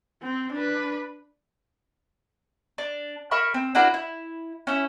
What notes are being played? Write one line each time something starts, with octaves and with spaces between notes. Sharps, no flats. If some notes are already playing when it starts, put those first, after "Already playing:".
C4
D4 B4
D4
A#4 E5 B5 C#6
C4
D4 E4 F#4 A#4
E4
C#4 E4